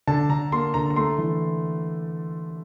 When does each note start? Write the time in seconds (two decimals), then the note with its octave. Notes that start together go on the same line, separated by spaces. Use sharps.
0.07 D3 A5
0.29 D3 A#5
0.52 A#3 C6
0.74 D3 A#5
0.90 A#5
0.96 A3 C6
1.18 E3